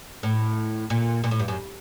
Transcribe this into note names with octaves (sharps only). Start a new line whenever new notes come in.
A2
A#2
A#2
A2
G2
F#2